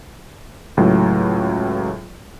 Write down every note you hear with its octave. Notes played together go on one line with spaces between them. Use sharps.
C#2 A2 F#3